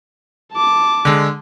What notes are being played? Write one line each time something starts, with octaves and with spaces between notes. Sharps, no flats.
A5 D6
D3 G#3